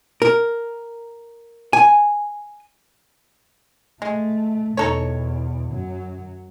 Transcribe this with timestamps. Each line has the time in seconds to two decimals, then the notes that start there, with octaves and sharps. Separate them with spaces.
0.22 A#4
1.73 G#5
4.02 G#3 A3
4.77 E2 B2 D#4 A4 C#5
5.70 F#2 F#3